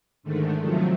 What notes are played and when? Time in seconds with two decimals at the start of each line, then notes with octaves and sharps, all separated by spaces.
0.23 G#2 D3 D#3 A3
0.59 C3 D#3 F3 F#3 A3